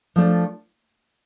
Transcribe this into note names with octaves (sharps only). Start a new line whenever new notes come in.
F3 A3 D4